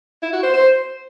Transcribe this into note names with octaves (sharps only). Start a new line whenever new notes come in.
E4
F#4
C5
C5